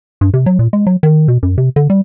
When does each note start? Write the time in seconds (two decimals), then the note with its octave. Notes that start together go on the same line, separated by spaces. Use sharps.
0.21 G2
0.34 C3
0.46 F#3
0.59 A#2
0.73 G#3
0.87 F#3
1.03 D#3
1.28 B2
1.43 F#2
1.58 C3
1.76 D3
1.90 G3